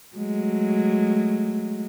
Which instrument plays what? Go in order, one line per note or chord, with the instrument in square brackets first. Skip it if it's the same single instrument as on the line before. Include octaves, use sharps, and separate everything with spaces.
[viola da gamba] F#3 G#3 A3